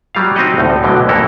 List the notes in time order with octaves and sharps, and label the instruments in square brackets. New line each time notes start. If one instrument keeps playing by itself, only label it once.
[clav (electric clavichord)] F#3 G3 F4 F5
C4 D#4 F#4 G4 D#5 F#5
D2 A2
B1 B2 D3 F#3 G5
F2 E3 A#3 E4 A4 A#4